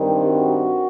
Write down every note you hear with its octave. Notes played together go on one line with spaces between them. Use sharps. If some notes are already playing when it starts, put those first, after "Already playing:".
Already playing: G2 D#3 G3 C4
F#4